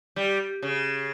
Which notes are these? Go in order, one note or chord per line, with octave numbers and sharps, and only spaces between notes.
G3
C#3